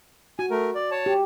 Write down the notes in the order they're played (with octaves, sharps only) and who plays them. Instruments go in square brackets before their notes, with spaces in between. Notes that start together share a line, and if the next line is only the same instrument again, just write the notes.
[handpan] F#4 [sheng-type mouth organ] G#5
[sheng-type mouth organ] A3 A#4
D5
C#5 A5
[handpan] G4